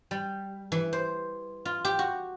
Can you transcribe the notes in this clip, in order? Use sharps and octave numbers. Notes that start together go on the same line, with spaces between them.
G3
E3
C5
F4
G4
F#4